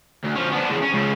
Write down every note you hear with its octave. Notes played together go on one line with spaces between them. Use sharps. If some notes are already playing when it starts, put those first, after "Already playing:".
D2
F3 C#4
B3 D4
E2 C#3
C#4
C#2 C#3